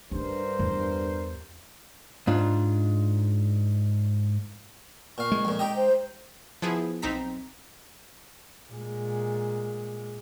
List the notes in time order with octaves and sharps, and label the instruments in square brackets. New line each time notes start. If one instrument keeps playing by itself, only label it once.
[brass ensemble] G2 A#4 C5 [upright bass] C#4 D4
[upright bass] E2
[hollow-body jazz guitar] G#2 D4 F4
[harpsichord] A#2 F5 [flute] C#6
[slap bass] G#3
[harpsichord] F2 A#2
[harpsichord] D#4 G4 D#5 [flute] G5
[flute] C5
[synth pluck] F3 B3 E4 G#4
B1 C4 D#4 A#5 B6
[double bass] A#2 G#3